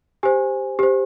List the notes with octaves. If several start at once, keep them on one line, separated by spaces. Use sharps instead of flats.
G4 C5 G#5
G4 C5